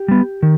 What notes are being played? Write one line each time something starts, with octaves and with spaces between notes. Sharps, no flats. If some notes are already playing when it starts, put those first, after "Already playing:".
Already playing: G4
G3 B3
D#3